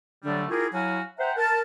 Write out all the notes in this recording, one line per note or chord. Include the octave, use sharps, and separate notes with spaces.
D3 F#3 G3 A3 D4
E4 F4 G4 G#4 A#4
F#3 E4 F#4 F5 G#5
C5 E5 F#5 G5 A#5
A#4 A5